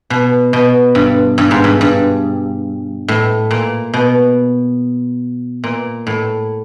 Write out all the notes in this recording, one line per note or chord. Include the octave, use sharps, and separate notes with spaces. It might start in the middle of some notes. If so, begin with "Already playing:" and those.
B2
B2
G2
G2
G#2
G2
G2
A2
A#2
B2
A#2
A2